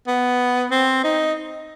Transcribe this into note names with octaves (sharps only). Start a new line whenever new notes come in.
B3
C4
D#4